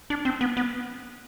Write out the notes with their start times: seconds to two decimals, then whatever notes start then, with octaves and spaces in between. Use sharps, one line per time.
0.10 D4
0.25 C4
0.41 B3
0.57 B3